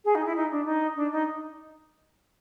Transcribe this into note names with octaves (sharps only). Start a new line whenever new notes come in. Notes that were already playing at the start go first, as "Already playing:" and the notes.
G#4
D#4
E4
D#4
D4
D#4
D4
D#4